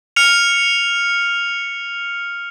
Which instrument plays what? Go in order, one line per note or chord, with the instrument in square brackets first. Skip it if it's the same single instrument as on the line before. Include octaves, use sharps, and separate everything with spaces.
[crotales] F6 C#7 F7